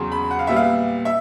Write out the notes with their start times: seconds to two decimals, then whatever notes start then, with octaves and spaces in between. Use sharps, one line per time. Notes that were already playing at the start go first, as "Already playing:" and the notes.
Already playing: E2 C#3 F#3 C6
0.12 B5
0.31 F#5
0.39 F5
0.47 A#2 G3 B3 E5
0.56 F5
1.05 E5